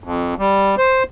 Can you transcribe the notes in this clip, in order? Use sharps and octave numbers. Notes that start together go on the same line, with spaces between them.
F2
G3
C5